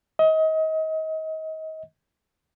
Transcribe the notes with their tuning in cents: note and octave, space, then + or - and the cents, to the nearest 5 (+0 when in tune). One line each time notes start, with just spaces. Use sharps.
D#5 +30